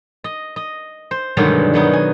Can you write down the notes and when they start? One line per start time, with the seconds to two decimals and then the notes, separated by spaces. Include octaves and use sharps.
0.24 D#5
0.56 D#5
1.11 C5
1.37 G2 B2 D3 D#3 F#3 G#3
1.74 D#3 F#3 B3 D#4
1.93 G#5